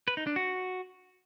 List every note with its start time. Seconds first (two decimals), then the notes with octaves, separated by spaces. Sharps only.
0.08 B4
0.17 D#4
0.27 D4
0.36 F#4